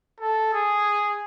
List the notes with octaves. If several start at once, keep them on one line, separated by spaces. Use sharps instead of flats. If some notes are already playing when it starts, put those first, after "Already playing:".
A4
G#4